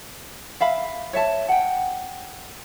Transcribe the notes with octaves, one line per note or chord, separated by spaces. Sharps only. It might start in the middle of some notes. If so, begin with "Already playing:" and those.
E5 F5 B5
C#5 E5 A5
F#5 G5